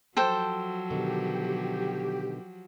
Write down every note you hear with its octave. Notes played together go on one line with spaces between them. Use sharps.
F3 F#3 A4 C5 G5
B2 D3 D#3 G4